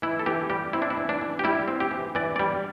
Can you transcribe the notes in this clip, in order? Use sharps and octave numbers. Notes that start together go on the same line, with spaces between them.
E3 E4
A4
E3 G4
G3 G4
C4 E4
D4
E4
E3
D4
E3
G4
G3 E4
C4
G4
E3
E3 D5
G3 D5